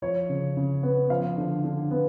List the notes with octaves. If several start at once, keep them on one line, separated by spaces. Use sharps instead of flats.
F3 C#5
C#3
C#3
B3
F3 F5
D3
D3
B3